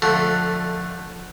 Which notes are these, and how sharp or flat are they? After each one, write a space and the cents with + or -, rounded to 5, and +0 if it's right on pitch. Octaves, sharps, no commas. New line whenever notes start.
D3 +15 F3 +20 A3 +0